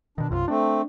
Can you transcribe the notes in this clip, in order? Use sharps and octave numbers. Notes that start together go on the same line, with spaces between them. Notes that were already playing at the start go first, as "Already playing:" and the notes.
B2 D#3 D4
B1 F#2 C3 F4
A3 C4 D4